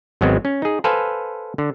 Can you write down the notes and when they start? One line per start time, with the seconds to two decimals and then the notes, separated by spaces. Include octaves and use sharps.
0.21 G#1 F#3 G#3 B3 C4
0.45 C#4
0.62 D#4 G#4
0.84 A4 B4 C5 F5 G#5
1.58 D3